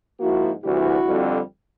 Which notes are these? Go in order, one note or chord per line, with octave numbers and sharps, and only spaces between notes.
G#2 F3 A#3 E4 F#4
D2 C3 E3 G3 E4 F#4
F2 D3 G3 C4